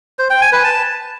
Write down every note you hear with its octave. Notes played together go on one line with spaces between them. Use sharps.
C5
G5
G#5
B4
A5